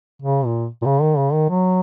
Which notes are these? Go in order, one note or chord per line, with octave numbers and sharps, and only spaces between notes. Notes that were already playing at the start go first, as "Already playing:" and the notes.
C#3
A#2
A#2
C#3
D#3
C#3
D#3
F#3